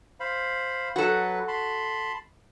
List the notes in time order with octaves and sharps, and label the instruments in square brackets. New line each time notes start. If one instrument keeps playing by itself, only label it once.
[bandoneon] C5 F5 B5
[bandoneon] F#3 B4 [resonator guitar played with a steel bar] F#4 A4
[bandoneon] A5 B5 C6